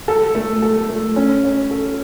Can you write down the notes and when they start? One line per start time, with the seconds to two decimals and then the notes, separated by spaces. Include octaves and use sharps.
0.08 A4
0.35 A3
0.62 A4
0.89 A3
1.16 C#4
1.44 C#5
1.71 A4